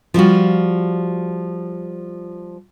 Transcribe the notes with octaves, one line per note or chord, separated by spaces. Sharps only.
F3 G3 F4 F#4